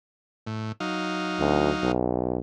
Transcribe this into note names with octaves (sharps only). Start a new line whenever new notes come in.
A2
F#3 D#4 F5
D2
B1